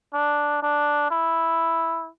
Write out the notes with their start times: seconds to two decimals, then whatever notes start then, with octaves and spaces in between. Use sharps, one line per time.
0.14 D4
0.63 D4
1.11 E4